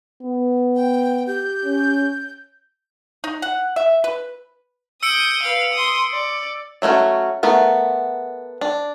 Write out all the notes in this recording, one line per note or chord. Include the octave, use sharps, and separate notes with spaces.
B3
G5
G4 G6
C#4
D#4
F#5
E5
B4
D#6 E6 G6 C#7 D7
B4 F5
C6 D#6
D5
F#3 A3 C#4 F#4
A3 B3 A#4
D4